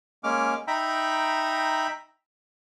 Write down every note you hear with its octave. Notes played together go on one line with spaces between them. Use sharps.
G#3 A#3 C#4 D6 F6
D#4 E5 G5 A#5 B5